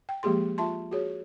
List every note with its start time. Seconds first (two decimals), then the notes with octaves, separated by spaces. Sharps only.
0.09 G5
0.23 F3 G#3 A#3 G4 G#4 C6
0.58 F4 E5 A5 C6
0.91 F#4 G#4 C#5